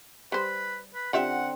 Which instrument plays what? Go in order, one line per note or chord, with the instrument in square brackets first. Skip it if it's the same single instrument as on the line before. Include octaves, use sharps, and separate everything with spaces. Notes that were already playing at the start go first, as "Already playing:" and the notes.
[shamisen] G3 C5 [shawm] B4
[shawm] B4
[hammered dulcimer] D3 C4 [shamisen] F4 G4 E5 [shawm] F#5